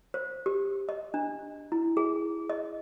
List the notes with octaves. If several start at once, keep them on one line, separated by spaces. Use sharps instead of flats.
C5
G4
D#5
D4
E4
G#4
D#5